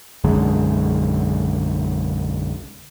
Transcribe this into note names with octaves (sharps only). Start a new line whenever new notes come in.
B1 F#2 D3 G#3